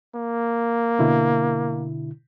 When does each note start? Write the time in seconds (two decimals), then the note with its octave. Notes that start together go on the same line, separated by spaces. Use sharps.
0.15 A#3
0.99 B2 D3 E4